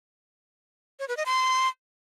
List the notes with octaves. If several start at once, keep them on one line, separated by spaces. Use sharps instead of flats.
C#5
B4
D#5
C6